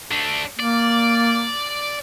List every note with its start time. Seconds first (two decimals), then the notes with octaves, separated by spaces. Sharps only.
0.11 A3 D4
0.60 A#3 D5